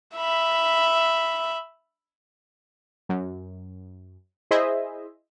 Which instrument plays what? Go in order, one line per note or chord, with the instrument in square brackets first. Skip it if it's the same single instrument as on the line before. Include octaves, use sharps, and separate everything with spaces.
[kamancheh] E5 B5
[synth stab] F#2
E4 G#4 C5 D#5 E5